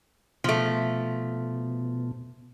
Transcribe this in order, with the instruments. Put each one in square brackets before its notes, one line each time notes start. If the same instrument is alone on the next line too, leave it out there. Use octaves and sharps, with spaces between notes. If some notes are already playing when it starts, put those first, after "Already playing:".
[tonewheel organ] B2 [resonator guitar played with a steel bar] F3 A3